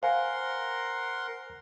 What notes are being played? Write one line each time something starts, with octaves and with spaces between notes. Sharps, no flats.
A#4 C5 F5 F#5 G#5 C6